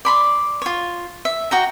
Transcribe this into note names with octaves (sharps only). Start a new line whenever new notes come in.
D5 B5 C6
F4 C#5
E5
F#4 G5 A#5